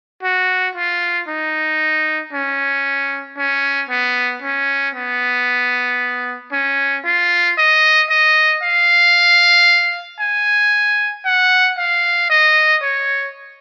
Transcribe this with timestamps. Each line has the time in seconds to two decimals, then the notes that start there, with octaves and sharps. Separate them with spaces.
0.23 F#4
0.75 F4
1.28 D#4
2.33 C#4
3.37 C#4
3.89 B3
4.42 C#4
4.95 B3
6.52 C#4
7.05 F4
7.58 D#5
8.10 D#5
8.63 F5
10.20 G#5
11.25 F#5
11.77 F5
12.30 D#5
12.82 C#5